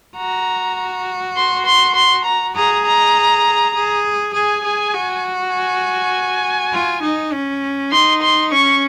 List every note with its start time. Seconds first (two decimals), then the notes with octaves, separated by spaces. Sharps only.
0.17 F#4 A#5
1.36 C6
1.65 C6
1.95 C6
2.25 A#5
2.56 G#4 A#5
2.85 A#5
3.75 G#4
4.34 G#4 G#5
4.64 G#4
4.94 F#4
5.54 G#5
6.73 F4
7.02 D#4
7.33 C#4
7.92 D#4 C6
8.22 C6
8.52 C#4 C#6